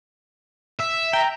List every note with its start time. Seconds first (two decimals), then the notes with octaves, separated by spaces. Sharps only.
0.80 E5
1.13 G5 A#5